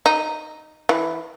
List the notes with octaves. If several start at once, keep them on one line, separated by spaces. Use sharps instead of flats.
D#4
E3